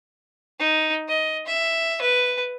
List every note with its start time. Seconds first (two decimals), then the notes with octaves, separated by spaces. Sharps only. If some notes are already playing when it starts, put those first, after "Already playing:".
0.60 D#4
1.09 D#5
1.47 E5
2.02 B4